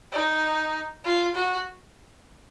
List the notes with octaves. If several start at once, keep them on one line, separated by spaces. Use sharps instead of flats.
D#4
F4
F#4